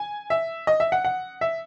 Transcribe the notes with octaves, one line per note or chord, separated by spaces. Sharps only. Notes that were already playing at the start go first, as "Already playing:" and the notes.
Already playing: G#5
E5
D#5
E5
F#5
F#5
E5